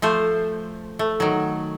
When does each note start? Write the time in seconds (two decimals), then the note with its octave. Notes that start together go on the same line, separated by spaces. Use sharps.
0.02 F3 A3 C5
0.99 A3
1.20 D#3 F#3